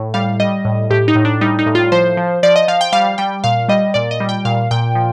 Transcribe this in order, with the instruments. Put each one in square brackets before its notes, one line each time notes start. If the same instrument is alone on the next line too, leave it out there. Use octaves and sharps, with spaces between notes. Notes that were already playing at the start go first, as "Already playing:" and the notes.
Already playing: [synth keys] A2
G3 F5
G3 D#5
A2
A2 G4
D#4
A2
D4
G3 D#4
D#4
A2
F4
F3 C5
F3
F3 D5
D#5
F3 F5
G5
G3 F5
G3 G5
A#2 F5
G3 D#5
A#2 D5
D#5
G3
G5
A#2 F5
A#2 G5
F3